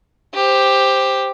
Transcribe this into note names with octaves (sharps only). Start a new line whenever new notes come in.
G4 C5